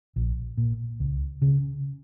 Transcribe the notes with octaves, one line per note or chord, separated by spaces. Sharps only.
A#1
A#2
C#2
C#3